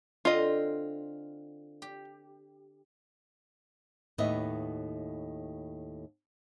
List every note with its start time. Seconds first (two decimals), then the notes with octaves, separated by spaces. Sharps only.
0.25 D3 C4 F4 D#5
1.82 G4
4.18 D#2 A2 B3 D#5 E5